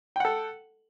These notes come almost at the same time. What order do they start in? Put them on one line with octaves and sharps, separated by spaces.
G5 F#5 A4